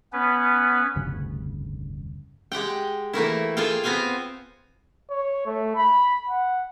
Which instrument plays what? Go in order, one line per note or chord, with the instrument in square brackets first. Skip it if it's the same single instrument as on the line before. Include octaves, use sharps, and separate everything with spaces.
[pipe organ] B3 C#4 B4
[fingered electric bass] F1 D2 G2 C#3
[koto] G#3 G4 F#5 G5
E3 A3 A#3 E4
F4 G#4 A4 F5 G5
B3 C4 F5 G5 G#5
[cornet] C#5
A3
B5
F#5